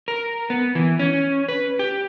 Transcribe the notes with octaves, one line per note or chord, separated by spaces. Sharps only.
A#4
B3
E3
C#4
B4
G4